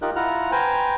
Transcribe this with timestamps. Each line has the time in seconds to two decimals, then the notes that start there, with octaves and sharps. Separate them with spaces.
0.02 D#4 F4 G4 A#4 F#6
0.16 E4 F4 F#5 A#5 F6
0.52 B4 C5 G5 G#5 A#5